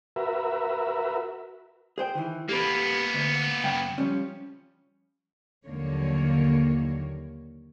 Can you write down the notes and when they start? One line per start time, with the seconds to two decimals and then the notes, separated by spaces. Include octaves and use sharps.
0.16 F#4 A#4 B4 E5
1.98 G#4 C5 G5
2.15 D#3 E3
2.49 A#3 B3 G4 A4 B4
3.14 D2
3.64 F#2 C#3 G5
3.98 F3 G3 C#4
5.66 D#2 D3 F3 F#3 A#3 C#5